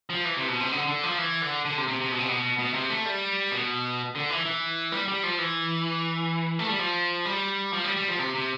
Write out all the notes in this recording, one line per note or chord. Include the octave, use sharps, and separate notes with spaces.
F3
E3
C3
B2
C3
D3
D3
F3
E3
D3
D3
C3
C3
C3
B2
C3
B2
B2
C3
A3
G3
B2
D3
E3
E3
G3
G3
F3
E3
A3
G3
F3
G3
F3
G3
G3
F3
C3
C3